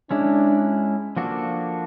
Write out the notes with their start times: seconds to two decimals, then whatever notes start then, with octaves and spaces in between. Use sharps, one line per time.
0.11 G#3 C#4 D4 E4
1.17 F3 A#3 D4 F#4 A4